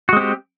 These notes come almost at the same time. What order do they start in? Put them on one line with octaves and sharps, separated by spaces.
F#4 G#3 C4 G4